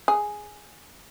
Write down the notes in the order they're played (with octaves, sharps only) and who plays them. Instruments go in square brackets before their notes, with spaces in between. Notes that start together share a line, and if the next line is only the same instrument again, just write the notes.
[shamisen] G#4